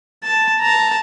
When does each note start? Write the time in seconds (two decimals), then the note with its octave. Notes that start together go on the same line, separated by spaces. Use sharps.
0.23 A5
0.60 A5 A#5